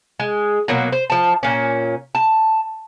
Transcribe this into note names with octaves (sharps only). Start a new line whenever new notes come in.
G#3
B2 F#3 A#3
C5
F3 A5
A#2 C#4
A5